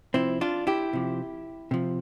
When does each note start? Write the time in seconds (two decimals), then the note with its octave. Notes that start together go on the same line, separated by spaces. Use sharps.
0.14 C3 F3 C4 E4
0.41 D4 F4
0.67 E4 G4
0.93 C3 F3
1.71 C3 F3